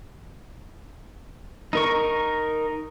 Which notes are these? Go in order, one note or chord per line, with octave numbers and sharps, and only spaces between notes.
D#4 A#4 C#6